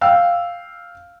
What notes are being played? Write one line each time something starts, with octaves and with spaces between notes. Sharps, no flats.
F5 G5 E6